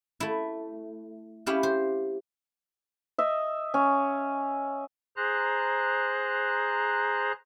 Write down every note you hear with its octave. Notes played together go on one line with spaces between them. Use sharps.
A3 E4
C#4 E4 G4 F5
C5
D#5 E5
C#4
G#4 C5 A#5 F#6